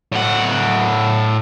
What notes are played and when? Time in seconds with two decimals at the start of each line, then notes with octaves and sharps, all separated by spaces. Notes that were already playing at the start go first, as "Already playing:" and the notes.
0.12 A2 F#5